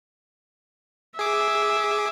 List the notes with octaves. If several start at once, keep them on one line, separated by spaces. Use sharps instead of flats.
G#4 E5 D6